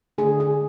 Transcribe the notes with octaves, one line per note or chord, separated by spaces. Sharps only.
D3 A3 D4 G#4
G#4